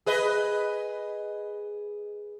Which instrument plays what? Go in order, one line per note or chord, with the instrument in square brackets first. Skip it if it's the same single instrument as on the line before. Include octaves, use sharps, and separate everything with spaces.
[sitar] G#4 B4 D#5